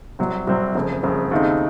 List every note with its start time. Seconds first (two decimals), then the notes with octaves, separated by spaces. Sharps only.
0.19 C2 C3 F#3 C4
0.47 C2 C3 F#3 C4
0.75 F#1 F2 C#3
1.03 F#1 F2 C#3
1.31 D#2 C#3 A3 C4 D#4